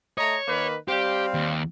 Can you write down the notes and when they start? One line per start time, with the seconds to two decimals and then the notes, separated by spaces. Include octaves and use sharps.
0.18 A3 C#5 D#5 A#5
0.47 D#3 A#3 B4
0.88 G3 C4 G4 F5
1.34 D#2